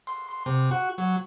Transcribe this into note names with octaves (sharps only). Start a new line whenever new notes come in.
C6
C6
C3
F#4
F#3